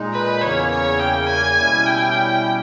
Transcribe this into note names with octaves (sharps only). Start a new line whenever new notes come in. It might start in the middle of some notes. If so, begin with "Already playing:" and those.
Already playing: A#2 G#3 D#4
B4
E2 C#3 E3 A#3 C#4 C#5
C#5
G5
G#5
B2 G3 C#4 E4
G5